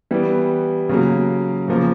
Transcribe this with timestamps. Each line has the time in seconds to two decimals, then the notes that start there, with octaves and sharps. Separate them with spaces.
0.11 E3 G3 B3
0.89 C#3 F#3 A#3
1.68 E2 C#3 F3 A#3